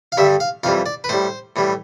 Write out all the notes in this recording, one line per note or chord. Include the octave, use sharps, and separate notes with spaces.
F5
G2 D3 G3 E5
F5
F2 E3 G3 F5
D5
B4
A2 G3 C5
A2 E3 G3